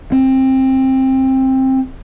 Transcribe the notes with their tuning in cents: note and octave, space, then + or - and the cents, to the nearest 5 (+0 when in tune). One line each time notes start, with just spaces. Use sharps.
C4 +15